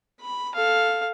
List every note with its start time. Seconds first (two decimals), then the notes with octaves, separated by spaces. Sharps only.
0.21 B5
0.54 A4 F5